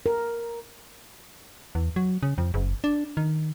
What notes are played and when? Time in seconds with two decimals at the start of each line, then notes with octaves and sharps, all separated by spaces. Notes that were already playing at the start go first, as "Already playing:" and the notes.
0.06 A#4
1.75 E2
1.96 F#3
2.23 C#3
2.38 F2
2.54 F#1
2.84 D4
3.17 D#3